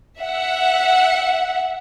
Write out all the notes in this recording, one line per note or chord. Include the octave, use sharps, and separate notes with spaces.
E5 F#5